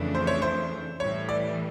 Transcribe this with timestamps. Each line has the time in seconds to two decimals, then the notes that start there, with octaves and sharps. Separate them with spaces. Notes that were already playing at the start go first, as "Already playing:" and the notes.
Already playing: F2 C#3 E3 A3 D4
0.15 C5
0.27 C#5
0.42 C5
1.00 A2 E3 G3 C#5
1.29 D5